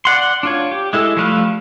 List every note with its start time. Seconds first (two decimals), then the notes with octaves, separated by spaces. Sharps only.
0.05 D5 F#5 C6
0.43 D4 F4 C#5
0.71 G4
0.93 G#3 E4 A4
1.17 F3 G3 A3 B4 F5